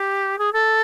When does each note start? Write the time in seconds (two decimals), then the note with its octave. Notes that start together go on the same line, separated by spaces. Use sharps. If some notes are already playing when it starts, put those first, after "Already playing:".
Already playing: G4
0.39 G#4
0.53 A4